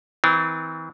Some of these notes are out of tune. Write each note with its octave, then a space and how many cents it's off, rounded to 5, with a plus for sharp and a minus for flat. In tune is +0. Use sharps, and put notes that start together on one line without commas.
E3 -35 C4 -40